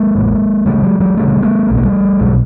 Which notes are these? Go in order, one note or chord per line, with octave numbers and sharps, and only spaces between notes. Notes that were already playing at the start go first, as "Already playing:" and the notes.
Already playing: G#3 A#3
A1 A2
D2 C#3 G3 A3
F#3 G#3
F#3 G#3
D2 C#3 G3 A3
G#3 A#3
B1 B2 A3 A#3
G3 A3
B1 B2 F#3 G#3